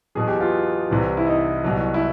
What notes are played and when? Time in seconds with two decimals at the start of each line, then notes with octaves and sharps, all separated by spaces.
0.15 E2 B2 F#3 G#4
0.27 G4
0.40 F4
0.90 C2 C3 E3
1.17 E4
1.27 D#4
1.64 C2 B2 F#3
1.94 E4